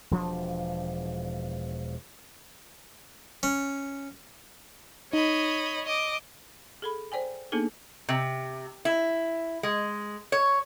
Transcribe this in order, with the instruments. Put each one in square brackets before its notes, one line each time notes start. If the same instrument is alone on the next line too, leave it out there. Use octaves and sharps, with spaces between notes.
[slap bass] E1 F3 D4
[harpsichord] C#4
[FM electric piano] D#4 [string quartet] C#5 D#5 B5
[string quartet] D#5 D6
[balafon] G#4 A4 B5
C5 D5 G5 G#5
A#3 B3 D4 D#4 G#4 A4
[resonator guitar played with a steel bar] C3
E4
G#3
C#5